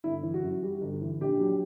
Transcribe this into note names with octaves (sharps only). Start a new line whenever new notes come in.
G1 E4
E3
F#4
F#2
G3
G1
E3
A#1 G4
F#3